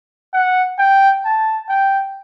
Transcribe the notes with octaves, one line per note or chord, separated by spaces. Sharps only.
F#5
G5
A5
G5